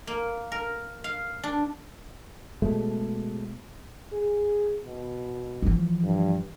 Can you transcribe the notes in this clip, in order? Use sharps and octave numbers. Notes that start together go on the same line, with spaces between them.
A#3
A#4
F5
D4
B2 G#3 A3
G#4
B2
E3 F3
G2